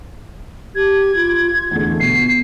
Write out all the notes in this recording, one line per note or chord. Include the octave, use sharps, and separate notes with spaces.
G4 G#6
F4
E2 D3 A3
B2 C7